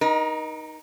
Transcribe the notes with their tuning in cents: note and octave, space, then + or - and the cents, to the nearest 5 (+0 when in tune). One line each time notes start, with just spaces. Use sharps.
D#4 +0 A#4 +35